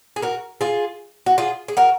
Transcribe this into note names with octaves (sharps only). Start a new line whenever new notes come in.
G#4
F#4 A#4
F4 G#4
F#4
F4 G#4
G#4
F#4 A#4